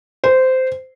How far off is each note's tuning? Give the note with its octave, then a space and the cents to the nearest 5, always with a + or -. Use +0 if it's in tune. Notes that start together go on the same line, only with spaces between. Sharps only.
C5 -15